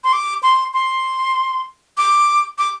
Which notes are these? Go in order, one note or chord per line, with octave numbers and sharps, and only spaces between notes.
C6
D6
C6
C6
D6
D6